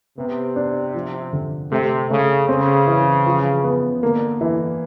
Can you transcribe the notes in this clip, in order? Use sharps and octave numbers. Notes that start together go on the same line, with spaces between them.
C3 B3
D4
F3
D3
C3 A3
C#3 A3
C#3 C4
E3
F3
B3
D3 A#3
E3